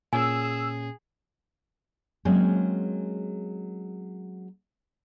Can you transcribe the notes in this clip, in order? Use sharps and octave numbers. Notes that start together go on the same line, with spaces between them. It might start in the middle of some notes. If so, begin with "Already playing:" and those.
A#2 C#4 G#4 G#5 E6
F#3 G#3 A#3 C4 C#4 G#4